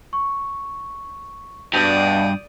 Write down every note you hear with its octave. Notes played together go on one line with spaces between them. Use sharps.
C#6
G2 B2 G3 D4 D5 D#6 G6